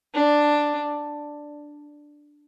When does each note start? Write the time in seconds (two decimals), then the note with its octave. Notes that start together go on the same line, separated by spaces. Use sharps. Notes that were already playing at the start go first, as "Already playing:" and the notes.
0.14 D4